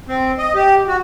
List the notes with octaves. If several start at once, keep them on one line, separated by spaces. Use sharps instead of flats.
C4
D#5
G4
F#4